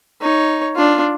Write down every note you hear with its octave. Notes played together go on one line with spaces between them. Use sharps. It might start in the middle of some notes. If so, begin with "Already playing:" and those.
D#4 C#5
D4 F4